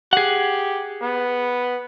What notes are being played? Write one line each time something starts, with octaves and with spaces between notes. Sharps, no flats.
G4 G#4 F#5
B3